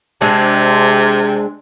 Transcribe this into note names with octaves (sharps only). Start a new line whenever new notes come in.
C3 G#3 C4 D4